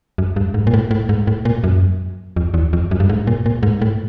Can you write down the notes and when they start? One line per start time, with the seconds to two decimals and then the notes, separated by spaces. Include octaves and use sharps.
0.18 F#2
0.36 G2
0.54 G#2
0.67 A#2
0.74 A2
0.91 A2
1.09 G#2
1.27 A2
1.45 A#2
1.64 F#2
2.36 F2
2.54 E2
2.73 F2
2.91 F#2
3.00 G2
3.09 G#2
3.27 A#2
3.46 A#2
3.63 G#2
3.82 A2